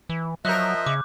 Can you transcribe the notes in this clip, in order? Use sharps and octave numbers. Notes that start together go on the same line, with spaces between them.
E3
F3 F#3 A#4 D#5 E5 F#6 G6
C#3 D6